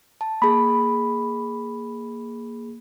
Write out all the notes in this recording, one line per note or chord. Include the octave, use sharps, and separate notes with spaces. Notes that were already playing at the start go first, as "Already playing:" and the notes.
A5
A#3 G#4 B5